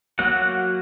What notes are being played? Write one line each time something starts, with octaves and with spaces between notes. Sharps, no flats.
F#3 A#3 F#4 F#5